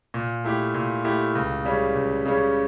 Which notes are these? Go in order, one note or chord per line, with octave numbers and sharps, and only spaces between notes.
A#2
A3 E4 G4
A#2
A3 E4 G4
C#2
C#3 G3 C#4
C#2
C#3 G3 C#4